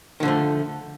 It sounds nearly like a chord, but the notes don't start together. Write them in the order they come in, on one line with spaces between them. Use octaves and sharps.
D#3 D3 F3 A3